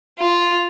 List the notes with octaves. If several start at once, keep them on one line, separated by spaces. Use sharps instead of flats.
F4